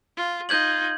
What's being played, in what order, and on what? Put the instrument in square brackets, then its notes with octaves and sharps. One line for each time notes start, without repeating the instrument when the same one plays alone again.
[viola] F4
[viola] D#4 F4 [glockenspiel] G6 G#6 F#7